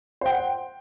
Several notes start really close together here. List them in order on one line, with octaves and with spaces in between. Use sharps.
C5 G5 F#5